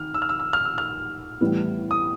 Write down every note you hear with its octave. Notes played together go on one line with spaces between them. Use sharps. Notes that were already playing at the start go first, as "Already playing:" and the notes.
Already playing: D#3 F6
E6
F6
E6
E6
F6
E6
F6
A2 E3 G3 B3 E4
D#6